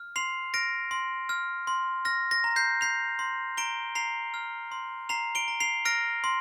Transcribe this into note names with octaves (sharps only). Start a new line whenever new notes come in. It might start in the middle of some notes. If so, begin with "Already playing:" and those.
Already playing: F6
C6 C7 F7
F6 A#6 D7
C6
F6
C6
F6 A#6
A#6
A#5
G6 C7
G6 C7 F7
C6
A#5 D7 G7
A#5 C7 F7
F6
C6
A#5 C7 F7
D7 G7
A#5
C7 F7
F6 A#6 D7
C6